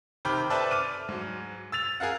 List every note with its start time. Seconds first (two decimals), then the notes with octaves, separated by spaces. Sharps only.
0.25 C3 D#3 G5 B5 D6 F6
0.50 A4 B4 C5 D5 E5 A5
0.71 D6 F6 D#7
1.09 G#2 F#3
1.72 E6 A6 F7
2.00 G#4 A#4 F5 F#5